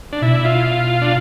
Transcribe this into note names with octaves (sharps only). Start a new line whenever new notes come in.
D4
B2 E4
F4
D4